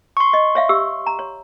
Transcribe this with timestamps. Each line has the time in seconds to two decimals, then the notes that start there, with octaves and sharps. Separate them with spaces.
0.17 C6 C#6
0.33 D#5
0.55 C#5 E5 F5
0.69 G4 E6
1.07 A#5
1.19 C#5